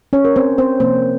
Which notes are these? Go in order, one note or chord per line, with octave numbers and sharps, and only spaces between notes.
C#4 C#5
A#4
C4 C5
C4 C5
C3 F3 A#3 C4 C5